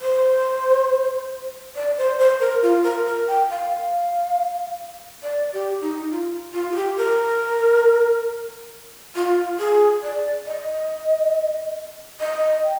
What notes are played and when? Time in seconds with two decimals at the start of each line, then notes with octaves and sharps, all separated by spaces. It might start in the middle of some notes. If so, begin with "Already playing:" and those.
0.02 C5
1.76 D5
1.98 C5
2.19 C5
2.40 A#4
2.63 F4
2.84 A#4
3.06 A#4
3.28 G5
3.50 F5
5.23 D5
5.53 G4
5.81 D#4
6.11 F4
6.54 F4
6.72 G#4
6.75 G4
6.97 A#4
9.16 F4
9.60 G#4
10.03 D5
10.47 D#5
12.20 D#5
12.63 G5